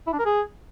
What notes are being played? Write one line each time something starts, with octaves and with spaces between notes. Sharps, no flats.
E4
D4
A#4
G#4